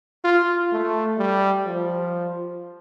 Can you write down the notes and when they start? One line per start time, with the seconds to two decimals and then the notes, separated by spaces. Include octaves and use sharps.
0.24 F4
0.72 A3
1.18 G3
1.66 F3